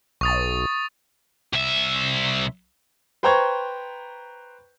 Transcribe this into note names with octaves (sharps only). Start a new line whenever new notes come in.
B1 C#6 D#6 A6
C2 E5
B4 C5 G5 A#5 C#6 G#6